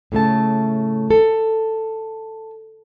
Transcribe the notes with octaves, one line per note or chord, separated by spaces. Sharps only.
A2 C#3 A3 A5
A4